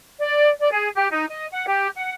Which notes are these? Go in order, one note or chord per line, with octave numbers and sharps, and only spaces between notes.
D5
D5
G#4
G4
D#4
D#5
F#5
G4
F#5